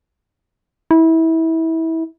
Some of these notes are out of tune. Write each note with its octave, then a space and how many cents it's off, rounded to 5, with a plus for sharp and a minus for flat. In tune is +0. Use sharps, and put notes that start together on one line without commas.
E4 -25